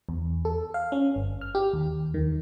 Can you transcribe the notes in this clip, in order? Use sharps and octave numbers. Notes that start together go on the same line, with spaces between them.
E2
A4
F5
C#4
G1
F6
G4
D#2
D#3